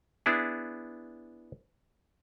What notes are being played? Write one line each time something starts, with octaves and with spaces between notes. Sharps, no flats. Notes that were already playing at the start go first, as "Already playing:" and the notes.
B3 D4 E4 G#4